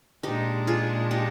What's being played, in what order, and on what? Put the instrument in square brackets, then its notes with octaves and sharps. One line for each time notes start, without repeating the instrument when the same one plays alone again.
[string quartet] A#2 G#3 D4 [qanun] D#4 G4
[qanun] F4 G#4
D#4 G4